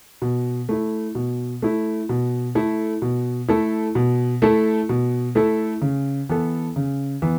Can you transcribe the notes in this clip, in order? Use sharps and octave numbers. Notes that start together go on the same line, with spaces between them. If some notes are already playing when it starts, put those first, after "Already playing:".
B2
A3 E4
B2
A3 E4
B2
A3 E4 A4
B2
A3 E4 A4
B2
A3 E4 A4
B2
A3 E4 A4
C#3
E3 B3 A4
C#3
E3 B3